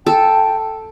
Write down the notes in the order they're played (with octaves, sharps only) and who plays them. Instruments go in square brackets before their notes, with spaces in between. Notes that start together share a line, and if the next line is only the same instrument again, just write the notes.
[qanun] A4 [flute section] G5 A5